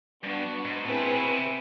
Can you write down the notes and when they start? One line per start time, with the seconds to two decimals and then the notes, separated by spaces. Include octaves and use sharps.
0.23 G2 B3 D4 F#4
0.65 G#2
0.85 A2 C4 E4 G#4 B4
1.01 A#2
1.16 B2
1.31 C3